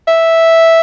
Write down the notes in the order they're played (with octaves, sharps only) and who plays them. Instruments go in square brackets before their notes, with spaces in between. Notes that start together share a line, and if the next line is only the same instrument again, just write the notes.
[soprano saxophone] E5